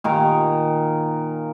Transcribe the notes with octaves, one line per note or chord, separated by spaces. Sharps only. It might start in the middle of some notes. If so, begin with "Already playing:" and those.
A#2 D#3 A#4